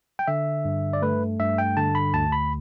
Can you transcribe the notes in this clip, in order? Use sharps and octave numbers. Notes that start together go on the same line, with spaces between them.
G5
D3 E5
G2
D5
A3 B4
G2 E5
G5
D3 A5
B5
D2 A5
B5